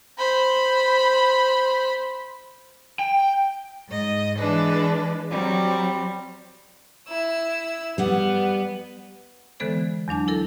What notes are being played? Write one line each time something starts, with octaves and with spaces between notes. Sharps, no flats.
C5 B5
G5
G#2 D#5
E3 G#3 D4 B4
F#3 G3 C4
E4 E6
G3 B3 F#5
D3 E3 G#3 B3 A4 C5
E2 F#3 D4 A5
E4 A4 A#4